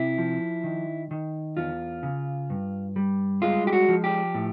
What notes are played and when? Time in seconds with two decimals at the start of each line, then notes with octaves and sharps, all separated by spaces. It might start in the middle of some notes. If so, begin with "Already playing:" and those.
Already playing: C3 E4
0.18 F3
0.64 D#3
1.11 D#3
1.57 E2 F4
2.03 C#3
2.50 G2
2.96 G3
3.42 G#3 F4
3.67 G4
3.73 F#4
3.89 F3
4.04 G4
4.34 A2